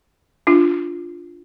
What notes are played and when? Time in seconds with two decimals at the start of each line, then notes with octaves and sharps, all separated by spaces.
0.47 D4 F4